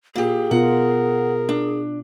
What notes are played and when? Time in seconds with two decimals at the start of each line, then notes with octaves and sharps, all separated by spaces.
0.16 A#2 G4 G#4
0.51 B2 B3 F4 A#4 F#5
1.49 D4